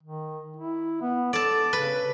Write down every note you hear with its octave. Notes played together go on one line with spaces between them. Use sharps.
D#3
E4
B3
A4 D5 A5
C#3 B4